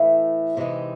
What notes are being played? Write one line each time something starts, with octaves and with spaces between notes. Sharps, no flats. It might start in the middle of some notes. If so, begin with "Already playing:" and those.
Already playing: A2 E3 A3
C3 E3 G#3 C4 D#4